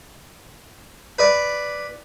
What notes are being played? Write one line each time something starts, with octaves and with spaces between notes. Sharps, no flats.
B4 D5